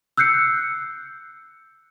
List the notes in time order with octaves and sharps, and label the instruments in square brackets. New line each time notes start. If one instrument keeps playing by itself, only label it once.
[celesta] E6 F#6 G6 C7 C#7